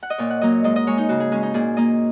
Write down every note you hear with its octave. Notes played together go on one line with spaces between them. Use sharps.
F#5
D#5
A#2 C#5
F#5
F#3 A#3 D#5
G#2 D#5
D#5
G#3 C#5
D#4
C#3 F#4
G#4
G#3 C#4
D#4
A#2 G#4
A#3 D#5